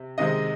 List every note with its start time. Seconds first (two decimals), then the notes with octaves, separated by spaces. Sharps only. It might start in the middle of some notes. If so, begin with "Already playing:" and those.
Already playing: C3
0.18 C3 D#3 G#3 C4 D#5